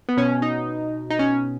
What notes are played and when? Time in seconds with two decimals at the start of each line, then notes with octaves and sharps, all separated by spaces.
0.09 B3
0.17 B2 C#4
0.42 D#4
1.10 D#4
1.19 C#4